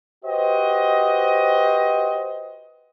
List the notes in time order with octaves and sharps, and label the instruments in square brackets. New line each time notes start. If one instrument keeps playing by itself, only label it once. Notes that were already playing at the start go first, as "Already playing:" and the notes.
[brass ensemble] F#4 G4 B4 C5 D#5